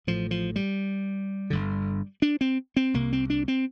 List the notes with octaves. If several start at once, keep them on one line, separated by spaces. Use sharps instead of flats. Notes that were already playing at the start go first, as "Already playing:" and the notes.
A1 A2 F3
F3
G3
G1 G2 D3
D4
C4
C4
C2 C3 A#3
C4
D4
C4